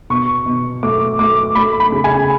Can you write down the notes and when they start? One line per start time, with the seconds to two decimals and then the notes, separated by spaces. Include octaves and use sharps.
0.10 B2 C#6
0.46 B2
0.83 A3 D6
1.19 A3 D6
1.55 A3 B5
1.80 B5
1.92 C#3
2.04 G#5